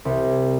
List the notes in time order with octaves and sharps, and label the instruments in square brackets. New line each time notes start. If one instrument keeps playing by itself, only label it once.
[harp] C2